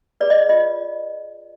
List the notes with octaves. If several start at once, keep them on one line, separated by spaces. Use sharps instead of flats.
G#4 B4 D5
D#5
F4 D#5